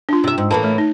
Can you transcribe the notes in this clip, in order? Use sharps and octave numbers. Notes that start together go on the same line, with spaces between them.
D4 F4
C3 E5
G#2
A2 E3 A#3 A5
A3 C#5
D#4